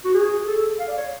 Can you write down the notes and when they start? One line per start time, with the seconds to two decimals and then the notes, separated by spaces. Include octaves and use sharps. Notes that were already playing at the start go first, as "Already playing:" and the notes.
0.05 F#4
0.14 G#4
0.46 A4
0.79 F5
0.88 D5
0.97 C#5